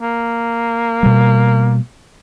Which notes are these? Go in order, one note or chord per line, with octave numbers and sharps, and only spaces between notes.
A#3
B2 G3